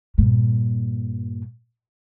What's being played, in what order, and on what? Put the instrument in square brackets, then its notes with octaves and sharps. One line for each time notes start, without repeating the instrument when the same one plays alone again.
[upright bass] G2 A#2